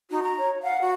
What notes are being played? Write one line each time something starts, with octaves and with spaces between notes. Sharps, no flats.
D#4 F#4
A#5
C#5
F5 F#5
F#4